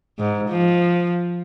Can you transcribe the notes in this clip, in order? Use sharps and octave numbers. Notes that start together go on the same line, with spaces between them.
G#2
F3